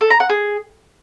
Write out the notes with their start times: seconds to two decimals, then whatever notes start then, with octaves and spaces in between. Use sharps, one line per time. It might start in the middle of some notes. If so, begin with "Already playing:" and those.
0.01 A4
0.10 A#5
0.20 F#5
0.29 G#4